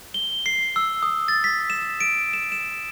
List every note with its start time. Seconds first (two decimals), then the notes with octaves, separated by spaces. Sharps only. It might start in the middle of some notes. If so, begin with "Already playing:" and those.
0.14 G7
0.46 C7
0.76 E6
1.03 D#6
1.28 A6
1.44 B6
1.70 E7
2.00 D7
2.33 E7
2.52 E7